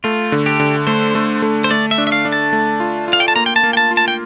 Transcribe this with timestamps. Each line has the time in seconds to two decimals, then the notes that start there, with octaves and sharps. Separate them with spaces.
0.04 A3 F4
0.32 D3
0.46 G4
0.60 D3
0.87 A3 C5
1.15 A3
1.42 A3
1.64 C5
1.71 A3 D5
1.91 E5
1.98 D4
2.07 E5
2.12 F5
2.25 D4
2.32 A5
2.53 A3
2.80 F4
3.08 F4
3.13 F5
3.20 G5
3.28 A5
3.36 A#3 A#5
3.46 G5
3.56 A5
3.63 A#3
3.73 G5
3.77 A5
3.91 F4
3.97 A5
4.08 G5